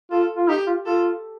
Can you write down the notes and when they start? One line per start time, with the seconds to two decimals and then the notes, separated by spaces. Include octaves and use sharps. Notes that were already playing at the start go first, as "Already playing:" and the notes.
0.11 F4 A4
0.37 F4
0.48 D#4 G4
0.67 F4
0.85 F4 A4